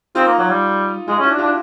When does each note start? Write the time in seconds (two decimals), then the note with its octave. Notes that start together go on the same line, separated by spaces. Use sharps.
0.15 C4 D#4 F4
0.27 A#3
0.39 F#3
0.50 G3
1.08 G#3 D#4 F4
1.19 C#4
1.23 E4 F#4
1.31 D4
1.38 F4 G4
1.43 D4